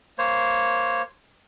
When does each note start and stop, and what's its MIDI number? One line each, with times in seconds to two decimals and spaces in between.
0.18 1.02 58
0.18 1.02 72
0.18 1.02 73